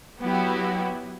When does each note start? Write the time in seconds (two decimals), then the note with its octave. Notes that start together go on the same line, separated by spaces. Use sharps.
0.20 F#3 B3 E4 F#4 G4